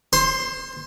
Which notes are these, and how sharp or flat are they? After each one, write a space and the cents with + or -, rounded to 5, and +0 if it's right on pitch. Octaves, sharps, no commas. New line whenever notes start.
C5 +30 C6 +0